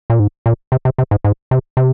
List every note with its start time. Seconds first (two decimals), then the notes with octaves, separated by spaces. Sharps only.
0.10 A#2
0.20 G#2
0.46 A#2
0.72 C3
0.85 C3
0.98 C3
1.11 G#2
1.24 G#2
1.51 C3
1.77 C3